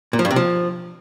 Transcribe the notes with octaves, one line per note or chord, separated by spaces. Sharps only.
A#2
F3
G2
C3
F3